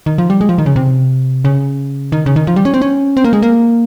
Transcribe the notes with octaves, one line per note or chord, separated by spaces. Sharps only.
D#3
F3
G3
G#3
F3
D#3
C#3
C3
C#3
D#3
C#3
D#3
F3
G3
C#4
C4
C#4
C4
A#3
G#3
A#3